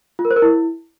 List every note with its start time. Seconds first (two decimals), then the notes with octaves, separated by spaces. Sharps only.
0.19 F4
0.25 A#4
0.31 C5
0.36 A#4
0.42 E4